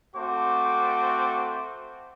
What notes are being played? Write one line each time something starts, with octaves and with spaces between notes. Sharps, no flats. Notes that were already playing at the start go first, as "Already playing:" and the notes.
A3 C4 F#4 C5 D6